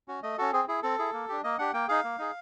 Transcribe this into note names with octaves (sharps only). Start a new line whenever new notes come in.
C#4 F#4
A3 D#5
C#4 F#4 A4
C4 G#4
E4 G#4
C4 A4
E4 G#4
A#3
D4 G4
A#3 D#5
D4 G4 F#5
A#3 G5
D#4 G#4 F5
A#3
D#4 G#4